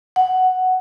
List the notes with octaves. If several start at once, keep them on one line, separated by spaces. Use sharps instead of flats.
F#5